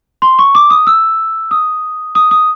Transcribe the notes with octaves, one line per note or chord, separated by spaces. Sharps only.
C6
C#6
D6
D#6
E6
D#6
D#6
D#6